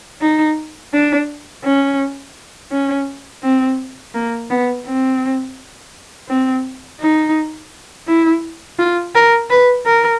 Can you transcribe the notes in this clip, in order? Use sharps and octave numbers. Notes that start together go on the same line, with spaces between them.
D#4
D4
C#4
C#4
C4
A#3
B3
C4
C4
D#4
E4
F4
A#4
B4
A#4